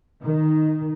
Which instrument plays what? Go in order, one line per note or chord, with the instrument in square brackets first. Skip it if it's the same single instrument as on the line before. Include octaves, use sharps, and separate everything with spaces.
[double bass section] D#3